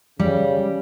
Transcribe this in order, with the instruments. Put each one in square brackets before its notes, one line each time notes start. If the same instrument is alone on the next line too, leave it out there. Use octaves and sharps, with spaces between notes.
[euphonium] C#3 [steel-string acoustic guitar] G3